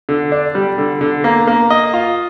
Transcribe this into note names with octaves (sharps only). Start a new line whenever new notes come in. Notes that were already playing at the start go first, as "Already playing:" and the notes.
D3
D4
G3
D3
D3
A#3
A#3
D#5
F4